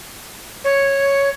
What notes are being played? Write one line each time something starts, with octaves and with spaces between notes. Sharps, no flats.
C#5